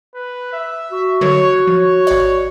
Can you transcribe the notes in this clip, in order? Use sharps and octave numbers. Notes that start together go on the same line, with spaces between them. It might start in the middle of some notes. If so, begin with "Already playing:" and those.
B4
E5
F#4
D3 D#3 F#3 C#5
F3 C#5
G#1 D5